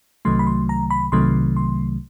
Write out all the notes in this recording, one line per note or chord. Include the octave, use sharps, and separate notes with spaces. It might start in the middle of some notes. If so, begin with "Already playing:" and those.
C2 C3 D#3 F#3 A3 C6
B5
C6
A#5
B5
C2 C3 D#3 F#3 A3 C6
C6